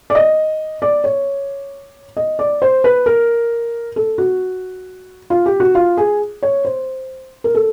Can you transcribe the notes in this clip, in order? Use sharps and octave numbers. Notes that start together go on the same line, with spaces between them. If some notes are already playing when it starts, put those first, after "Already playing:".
D5
D#5
D5
C#5
D#5
D5
C5
B4
A#4
A4
F#4
F4
G4
F#4
F4
G#4
C#5
C5
A#4
A4